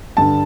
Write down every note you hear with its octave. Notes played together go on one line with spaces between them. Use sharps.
G2 D3 A5